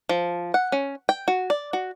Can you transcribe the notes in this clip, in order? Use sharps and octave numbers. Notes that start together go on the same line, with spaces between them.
F3
F#5
C#4
G5
F#4
D5
F#4